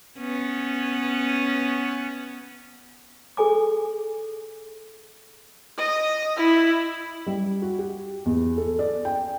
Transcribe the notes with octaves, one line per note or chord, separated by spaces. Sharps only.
B3 C#4
G#4 A4 G#5 D6
D#5
E4
G3
F#4
G4
E2
A4
D5
G5